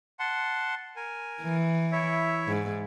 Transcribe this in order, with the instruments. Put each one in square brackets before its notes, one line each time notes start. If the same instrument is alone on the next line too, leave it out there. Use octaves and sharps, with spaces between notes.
[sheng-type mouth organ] F#5 A5 C6
A#4 G#5
[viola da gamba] E3
[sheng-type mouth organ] E4 C#5 E5
[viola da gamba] G#2